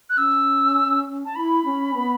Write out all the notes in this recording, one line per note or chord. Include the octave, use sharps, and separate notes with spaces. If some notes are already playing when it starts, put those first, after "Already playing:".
F#6
C#4 E6
A5
E4 B5
C#4
B3